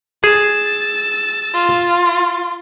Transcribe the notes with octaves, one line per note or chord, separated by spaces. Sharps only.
G#4 E6 A6
F4